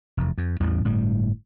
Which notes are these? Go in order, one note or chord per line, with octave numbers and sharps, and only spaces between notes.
F1 E2
F2
A1 E2 A2 G3
G1 A2 G3